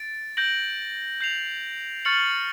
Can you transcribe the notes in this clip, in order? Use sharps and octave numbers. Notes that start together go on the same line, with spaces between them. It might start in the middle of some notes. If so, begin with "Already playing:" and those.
Already playing: A6 D7
G6 A#6 D7 F#7
G6 C7 F7
C#6 F6 A6 C#7 F#7